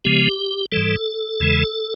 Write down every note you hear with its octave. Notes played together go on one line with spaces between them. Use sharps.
C#3 F3 G#3 B3 G4
G#2 E3 G3 A4
E2 C#3 E3 G#3